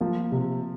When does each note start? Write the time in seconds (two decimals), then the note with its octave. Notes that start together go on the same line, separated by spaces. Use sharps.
0.01 F3 A#3
0.32 C3